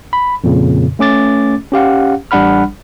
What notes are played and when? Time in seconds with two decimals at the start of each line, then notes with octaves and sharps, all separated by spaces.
0.13 B5
0.44 F2 A#2 C#3
0.99 A3 C#4 D6 A6
1.72 C#4 G4 F5 F#5
2.31 A1 G3 D4 F#5 B5 F6